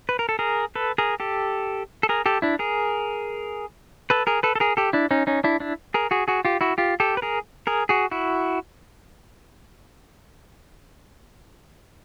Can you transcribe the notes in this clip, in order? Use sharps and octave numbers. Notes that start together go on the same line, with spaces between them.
B4
A#4
A4
G#4 A#4
A4 B4
G#4 A#4
G4 A4
A4
G#4 A#4
G4 A4
D4 E4
G#4 A#4
A4 B4
G#4 A#4
A4 B4
A4
G#4 A#4
G4 A4
D4 E4
C#4 D#4
C#4 D#4
D4 E4
D4 E4
G#4 A#4
F#4 G#4
F#4 G#4
F4 G4
E4 F#4
F4 G4
G4 A4
B4
G#4 A#4
G#4 A#4
F#4 G#4
E4 F#4